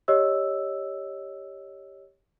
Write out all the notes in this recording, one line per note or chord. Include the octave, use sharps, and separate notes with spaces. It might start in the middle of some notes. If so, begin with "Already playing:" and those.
G4 C#5 D#5 E6